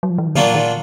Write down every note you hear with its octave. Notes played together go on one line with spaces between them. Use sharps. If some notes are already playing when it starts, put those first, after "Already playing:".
F#3
F3
E3
D#3
A#2 D3 F#3 A#3 D4 F4
D#3